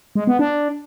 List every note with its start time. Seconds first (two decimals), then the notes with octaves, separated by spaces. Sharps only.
0.15 G#3
0.27 B3
0.39 D4